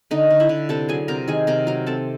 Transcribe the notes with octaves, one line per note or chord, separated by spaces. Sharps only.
D3 D#4 D#5
D3
E4 E5
D3
C3 A4 A5
F#3 G#4 G#5
C3 A#4 A#5
D#3 G#4 G#5
C3 A#4 A#5
F#3 A#4 A#5
C4 A4 A5